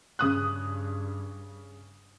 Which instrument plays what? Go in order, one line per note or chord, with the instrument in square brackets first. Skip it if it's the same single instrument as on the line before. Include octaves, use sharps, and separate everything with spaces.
[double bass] G2 [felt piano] C#3 D#6 F#6